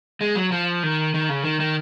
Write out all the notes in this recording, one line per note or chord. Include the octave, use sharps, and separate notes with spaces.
G#3
F#3
F3
D#3
D#3
C#3
D#3
D#3